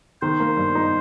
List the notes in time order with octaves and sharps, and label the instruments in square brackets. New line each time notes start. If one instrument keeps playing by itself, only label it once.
[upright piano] D#3 [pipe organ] C5
[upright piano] A#3
G2
D#4